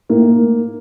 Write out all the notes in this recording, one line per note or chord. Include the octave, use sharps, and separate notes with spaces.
A2 A#3